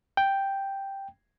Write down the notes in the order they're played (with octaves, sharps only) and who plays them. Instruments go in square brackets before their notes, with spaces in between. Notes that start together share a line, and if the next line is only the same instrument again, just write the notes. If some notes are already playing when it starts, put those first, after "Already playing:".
[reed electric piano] G5